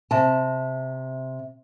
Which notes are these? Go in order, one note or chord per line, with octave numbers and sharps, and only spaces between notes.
C3 A5